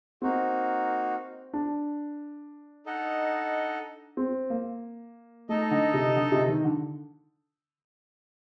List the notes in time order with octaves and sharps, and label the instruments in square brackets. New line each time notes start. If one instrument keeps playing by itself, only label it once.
[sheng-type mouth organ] A#3 D#4 F#4 [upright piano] C4
[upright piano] D4
[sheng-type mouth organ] D#4 A4 D#5 F#5
[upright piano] C4
A#3
[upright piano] A3 [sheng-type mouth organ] D#4 A4 D#5
[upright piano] D3
C3
D3
C3
D#3
D3